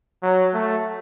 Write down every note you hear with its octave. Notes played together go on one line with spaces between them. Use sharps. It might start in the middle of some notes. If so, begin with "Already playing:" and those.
F#3
A3